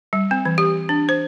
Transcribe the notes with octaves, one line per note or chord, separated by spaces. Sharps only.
G3
C4
E3
G4
D4
C5